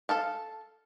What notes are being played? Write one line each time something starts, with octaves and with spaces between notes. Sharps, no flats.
A4 F5 A5